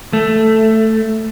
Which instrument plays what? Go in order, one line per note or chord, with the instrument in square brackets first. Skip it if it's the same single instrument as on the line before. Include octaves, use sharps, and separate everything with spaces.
[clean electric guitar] A3